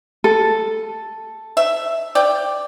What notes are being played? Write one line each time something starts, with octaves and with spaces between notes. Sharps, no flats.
A4
E5
D5 G5